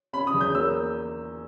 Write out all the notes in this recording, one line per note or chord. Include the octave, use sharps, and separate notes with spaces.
C#4 B5
D#6
E2
G6
A#3 E6